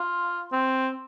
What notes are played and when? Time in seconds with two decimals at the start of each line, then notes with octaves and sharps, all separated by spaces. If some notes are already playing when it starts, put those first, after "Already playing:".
Already playing: F4
0.52 C4